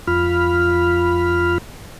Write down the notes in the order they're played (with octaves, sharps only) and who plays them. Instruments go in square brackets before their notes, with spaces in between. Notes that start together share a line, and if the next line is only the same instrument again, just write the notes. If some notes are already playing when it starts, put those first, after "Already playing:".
[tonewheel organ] F2 F4 B5 F6